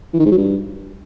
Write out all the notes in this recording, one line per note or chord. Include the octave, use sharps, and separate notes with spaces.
E3
D#3
G#2
F#3
G2